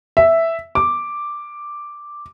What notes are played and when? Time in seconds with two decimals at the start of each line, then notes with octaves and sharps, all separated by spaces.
0.17 E5
0.75 D6